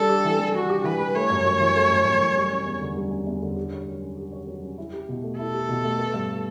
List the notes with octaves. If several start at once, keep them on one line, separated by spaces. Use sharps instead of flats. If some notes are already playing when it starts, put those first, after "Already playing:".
Already playing: G3 D4 A4
G4
E3
G3
D4 F#4
G4
E3 B4
G3
A3 C#5
F#2
F#2
E3
A3
F#2
F#2
E3
G3
C#4
E2
D3
G3
C#4
E2
D3
G4
C#5
F#3
C#4
G4
C#5
F#3
C#4
E4
G4
B2
A3
E4 A4
G4
B2
A3
B3
G2